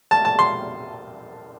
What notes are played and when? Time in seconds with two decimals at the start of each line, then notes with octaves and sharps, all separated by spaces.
0.11 A5
0.25 A5
0.39 C6